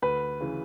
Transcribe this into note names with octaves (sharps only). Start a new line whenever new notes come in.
D2 B4
C#3 E3